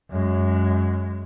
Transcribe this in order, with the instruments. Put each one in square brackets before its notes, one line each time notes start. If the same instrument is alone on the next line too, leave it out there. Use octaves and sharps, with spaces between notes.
[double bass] F#2 G#3